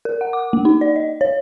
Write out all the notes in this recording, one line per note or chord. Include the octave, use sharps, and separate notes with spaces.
A#4
F#5
D6
A#3
D#4
D5
D#5
C#5